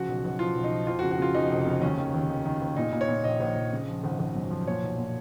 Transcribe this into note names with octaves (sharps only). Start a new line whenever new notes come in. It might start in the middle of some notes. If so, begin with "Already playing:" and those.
Already playing: C#3 F3 F#4
B1
B1
F3 F4
B1
D#4
F3
F2 F4
F#4
C#3
F#4
C#3 F4
F2 D#4
F1
C#3
D#2 C#4
D#3
D#2
D#3
D#3
D#2
A#2 D#4
A#2
C#5
A#2
A#1 D#5
A#1
A#1
C#3
F3
G#1
G#1
F#2
F3
A#2 C#5
B1
A#2